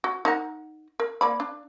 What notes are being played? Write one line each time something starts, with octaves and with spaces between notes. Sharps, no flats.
F#4
D#4 A#4 F#5
A#4
A#3 D5 B5
D4